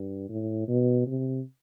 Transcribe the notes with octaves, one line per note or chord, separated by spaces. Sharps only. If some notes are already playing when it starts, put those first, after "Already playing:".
Already playing: G2
A2
B2
C3